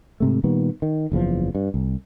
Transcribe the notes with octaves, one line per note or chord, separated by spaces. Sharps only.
G#2 C3 A3
A#2 D#3 G3 B3
D#3
F#1 E2 G#2 F3
G2
C2